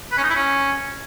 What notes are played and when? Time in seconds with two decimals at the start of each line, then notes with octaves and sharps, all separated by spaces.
0.12 B4
0.17 C#4
0.23 D#4
0.29 E4
0.35 C#4